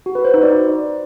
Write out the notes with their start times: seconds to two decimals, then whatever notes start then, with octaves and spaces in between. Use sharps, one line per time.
0.06 F#4
0.15 B4
0.25 C5
0.34 D#4
0.43 D5